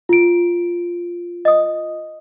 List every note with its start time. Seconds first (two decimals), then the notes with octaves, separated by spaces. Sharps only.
0.09 F4 D7
1.45 D#5 D#6